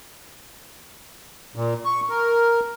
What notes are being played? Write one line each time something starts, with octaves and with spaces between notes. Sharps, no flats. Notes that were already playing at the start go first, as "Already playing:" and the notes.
A#2
C#6
A#4